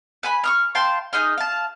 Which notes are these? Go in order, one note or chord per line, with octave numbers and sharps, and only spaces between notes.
B4 G#5 B5
C#6 D#6 F6
F5 G5 A5 C6
D#4 G#4 D#5 F6
F5 A5